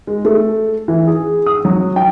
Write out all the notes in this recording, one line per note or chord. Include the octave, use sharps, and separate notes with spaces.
G#3
A3
E3
G#4
D#6
F#3
G5